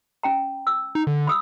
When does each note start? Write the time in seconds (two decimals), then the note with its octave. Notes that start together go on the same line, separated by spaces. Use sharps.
0.23 C#4 G5 A#5
0.67 E6
0.95 D#4
1.07 D3
1.27 B5 D#6 E6